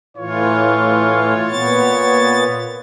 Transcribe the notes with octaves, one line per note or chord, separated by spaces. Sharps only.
A2 E3 F4 C#5
A#2 B3 A6